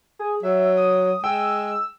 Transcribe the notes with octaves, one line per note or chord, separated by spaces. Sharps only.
G#4
F#3 E5
D#6
G#3 G5 E6